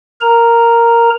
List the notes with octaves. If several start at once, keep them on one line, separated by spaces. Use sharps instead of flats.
A#4 A#5